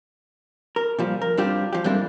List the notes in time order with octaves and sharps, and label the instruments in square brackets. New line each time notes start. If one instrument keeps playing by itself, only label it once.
[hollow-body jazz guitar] A#4
A#2 F3 G3
A#4
G2 C4 D4 F4 G4
F3 G4
F2 G#2 G3 A#3 D4 E4